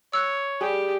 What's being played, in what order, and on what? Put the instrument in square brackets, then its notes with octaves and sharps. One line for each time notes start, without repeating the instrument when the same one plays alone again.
[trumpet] C#5 [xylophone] E6 F#6
[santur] G3 G#4 [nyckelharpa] G4